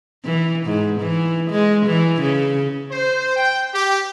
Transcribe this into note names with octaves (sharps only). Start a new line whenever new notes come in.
E3
G#2
E3
G#3
E3
C#3
C5
G5
G4